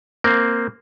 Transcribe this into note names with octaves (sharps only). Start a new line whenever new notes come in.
A#3 C4